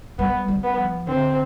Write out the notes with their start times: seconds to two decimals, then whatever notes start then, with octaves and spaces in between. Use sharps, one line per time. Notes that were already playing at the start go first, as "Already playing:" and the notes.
0.19 G3 B3
0.48 G3
0.63 B3
0.77 F3
1.07 D3 C4